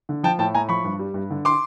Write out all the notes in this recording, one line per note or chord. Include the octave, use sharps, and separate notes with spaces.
D3
F3 G5 A5
A2 G5 A5
A2 G#5 A#5
F3 B5 C#6
G2
G3
G2
D3
C6 D6